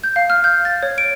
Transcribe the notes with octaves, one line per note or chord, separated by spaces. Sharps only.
G6
F5
F6
G6
A6
C#5
D7